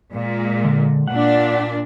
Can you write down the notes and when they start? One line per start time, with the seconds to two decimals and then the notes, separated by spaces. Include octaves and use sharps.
0.13 A#2 G#3
0.64 D3
1.08 A#2 D4 F#5